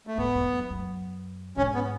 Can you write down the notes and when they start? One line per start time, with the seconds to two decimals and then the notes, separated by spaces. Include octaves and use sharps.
0.07 A3
0.18 G#2 B3
0.35 E2
0.52 F#2
0.70 F#2
1.57 G#2 C#4
1.75 B3